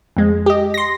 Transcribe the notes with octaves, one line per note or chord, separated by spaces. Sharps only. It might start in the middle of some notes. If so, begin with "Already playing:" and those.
F2 G#3
G4 D#5
C6 A#6